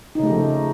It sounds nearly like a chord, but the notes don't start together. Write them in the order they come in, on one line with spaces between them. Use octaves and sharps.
D#4 C#3 A3 G4 F3